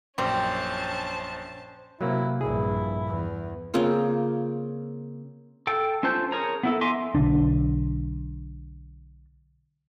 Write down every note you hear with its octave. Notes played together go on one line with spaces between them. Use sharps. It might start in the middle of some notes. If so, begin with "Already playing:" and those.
A#1 F#2 G3 C4 C#4 C5 A5
C3 F#3 A#3 E4 A#4
A#1 G2 E4 G#4
E2
C#3 A#3 C4 F4
A4 G5
C#4 F4 C5 A5 G6
G#4 A#4 C#5 A#5
B3 E4 A4
D#5 E5 G#5 C6 D6
B1 D3 D4